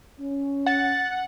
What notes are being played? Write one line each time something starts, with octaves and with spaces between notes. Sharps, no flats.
C#4
F#5 A6